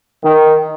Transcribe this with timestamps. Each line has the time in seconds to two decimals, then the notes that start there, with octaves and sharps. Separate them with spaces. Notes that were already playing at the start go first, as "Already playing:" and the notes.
0.24 D#3